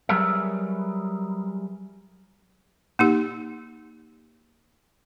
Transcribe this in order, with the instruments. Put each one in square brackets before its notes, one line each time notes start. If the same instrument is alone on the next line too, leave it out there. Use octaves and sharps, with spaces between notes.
[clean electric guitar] F#3 G3 G#4 A#4 B4 E5
[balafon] A#3 D#4 G4